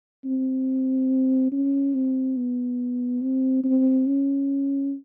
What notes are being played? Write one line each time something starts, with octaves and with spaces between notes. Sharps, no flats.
C4
C#4
C4
B3
C4
C4
C#4